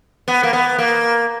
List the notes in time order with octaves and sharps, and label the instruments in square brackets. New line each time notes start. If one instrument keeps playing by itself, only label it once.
[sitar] B3
A#3
B3
A#3